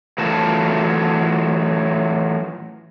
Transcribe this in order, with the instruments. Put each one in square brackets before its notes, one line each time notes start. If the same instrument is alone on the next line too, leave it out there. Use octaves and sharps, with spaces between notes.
[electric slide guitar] E3 F#3 A3 F4 A#4 A5